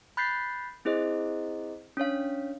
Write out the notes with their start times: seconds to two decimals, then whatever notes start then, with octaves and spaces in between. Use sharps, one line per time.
0.17 B5 F#6 G6 A6 B6 C7
0.85 C4 E4 G#4 C5 D#5
1.97 C#4 D4 C#5 F5